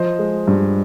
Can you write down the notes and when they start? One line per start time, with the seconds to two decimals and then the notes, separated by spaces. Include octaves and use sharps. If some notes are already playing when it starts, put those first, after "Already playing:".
Already playing: F3 C5 D#5
0.19 G#3
0.47 G2